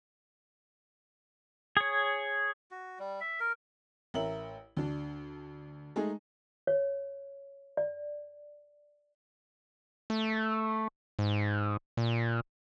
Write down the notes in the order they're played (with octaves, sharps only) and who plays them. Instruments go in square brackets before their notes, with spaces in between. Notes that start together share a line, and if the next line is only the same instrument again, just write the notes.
[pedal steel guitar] G#4 C#5
[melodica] F#4
G3
E5
A#4
[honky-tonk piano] A1 A#4 E5 F#7
D2 D4
G#3 A3 D#4 G#4
[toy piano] C#5
D5
[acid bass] A3
G#2
A#2